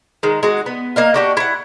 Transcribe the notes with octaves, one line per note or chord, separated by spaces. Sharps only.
D#3 G#3
G#3 F#4
B3
A#3 D#5 F5
D4 F#4 G4
E4 F#5